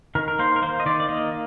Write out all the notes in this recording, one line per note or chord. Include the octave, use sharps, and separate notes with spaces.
D#3 A#4
A#4
A#3 C5
A#4
A#3 C5
D#5
D#3 D5
D5
A#3 D#5